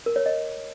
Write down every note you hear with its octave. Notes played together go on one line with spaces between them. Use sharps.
A#4
C#5
D#5